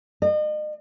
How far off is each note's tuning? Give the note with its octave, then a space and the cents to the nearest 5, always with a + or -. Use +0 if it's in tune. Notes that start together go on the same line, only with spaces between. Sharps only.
D#5 -40